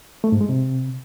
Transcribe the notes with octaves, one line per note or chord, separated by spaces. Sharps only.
A3
G#2
G#3
C3